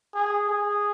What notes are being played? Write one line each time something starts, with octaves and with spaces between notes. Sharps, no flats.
G#4
G#4